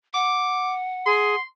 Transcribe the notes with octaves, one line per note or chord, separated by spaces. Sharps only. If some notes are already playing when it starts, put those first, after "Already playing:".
F#5 D6
G#4 C6